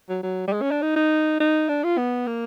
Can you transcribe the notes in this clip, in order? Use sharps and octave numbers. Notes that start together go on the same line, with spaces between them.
F#3
F#3
G3
G#3
C#4
D4
D#4
D#4
D#4
D4
F4
B3
A#3